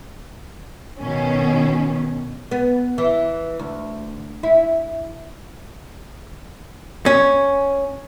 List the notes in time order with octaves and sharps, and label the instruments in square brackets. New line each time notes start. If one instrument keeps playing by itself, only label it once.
[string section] B2 D#3 C#4
[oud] B3
E3
D2
E4
[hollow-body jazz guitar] C#4